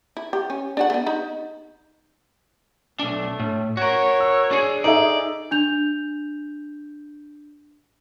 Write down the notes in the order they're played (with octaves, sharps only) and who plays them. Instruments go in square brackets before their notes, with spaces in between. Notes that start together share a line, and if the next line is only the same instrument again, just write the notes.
[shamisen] E4
G4
C#4
D4 F#4 F#5
A3 B3
D#4 B5
[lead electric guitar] B1 D4 [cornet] A3
[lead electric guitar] A2
[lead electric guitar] F#4 A#4 [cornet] C#5
[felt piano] E6
[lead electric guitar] D4 G#4
[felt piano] D#4 A4 E5 [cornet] G#4 [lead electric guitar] D5
[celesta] D4 G6 F7